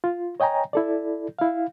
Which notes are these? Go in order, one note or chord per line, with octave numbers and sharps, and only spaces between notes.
F4
C#5 D#5 G5 G#5 A#5
E4 A4 D5
E4 F5